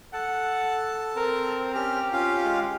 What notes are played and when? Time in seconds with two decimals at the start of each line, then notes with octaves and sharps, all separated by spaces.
0.14 A4 F#5 A5
1.17 C4 A#4
1.75 C#4 G4 F6
2.12 C#4 F4 F5
2.45 G#3